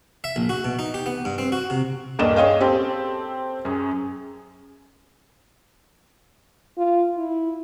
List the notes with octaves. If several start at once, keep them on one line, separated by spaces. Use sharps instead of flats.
E5
A#1
F#4
B2
D#4
G4
B3
G2
C4
F#4
C3
D#1 G2 A#3 D4 D#5 E7
G#4 C#5 D#5 F5 G5
C4 G4 A4
F#2 G#4
F4
E4